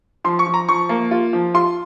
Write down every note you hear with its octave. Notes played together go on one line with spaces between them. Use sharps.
F3 C6
C#6
F3
A#5
F3 C#6
A#3
F4
F3
F4 C6